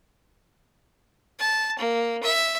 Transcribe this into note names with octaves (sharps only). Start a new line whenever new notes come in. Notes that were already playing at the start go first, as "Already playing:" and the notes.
A5
A#3
E5